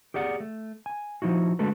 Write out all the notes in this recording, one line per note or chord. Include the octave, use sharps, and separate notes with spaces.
G4 G#4 D5 F#5
A3
G#5
F3 D#4 E4 F#4
D3 G#3 A3 F#4 A4 B4